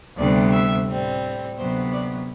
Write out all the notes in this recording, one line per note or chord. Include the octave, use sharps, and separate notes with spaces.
D2 C3 G3 B3 D5
E5
A2 G3 C4
D2 C3 F#3 B3 C5
D5